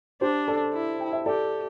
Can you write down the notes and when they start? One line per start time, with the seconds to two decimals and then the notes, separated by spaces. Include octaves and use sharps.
0.21 D4 G4 C5
0.48 A4 D5
0.74 E4
1.00 G5
1.13 E5
1.26 G4 A4 D5